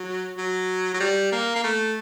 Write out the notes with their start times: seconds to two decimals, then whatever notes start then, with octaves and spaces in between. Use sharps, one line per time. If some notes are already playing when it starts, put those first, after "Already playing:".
Already playing: F#3
0.38 F#3
0.94 F#3
1.00 G3
1.32 A#3
1.56 A#3
1.64 A3